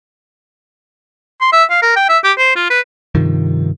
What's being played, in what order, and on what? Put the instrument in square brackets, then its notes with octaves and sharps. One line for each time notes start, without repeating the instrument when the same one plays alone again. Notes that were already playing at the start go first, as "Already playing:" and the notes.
[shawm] C6
E5
F5
A#4
G5
E5
G4
C5
F4
B4
[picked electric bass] G2 C3 D#3 F3